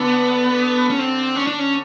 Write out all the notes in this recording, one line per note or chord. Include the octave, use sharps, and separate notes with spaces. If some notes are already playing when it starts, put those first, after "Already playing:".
Already playing: D3 B3
C#4
C4
C#4
D4
C#4